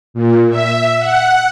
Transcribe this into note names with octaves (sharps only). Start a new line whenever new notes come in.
A#2
E5
F#5